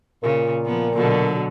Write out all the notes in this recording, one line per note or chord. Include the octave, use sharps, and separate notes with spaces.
A#2 C#3
F3 B3
B2 D3 F#3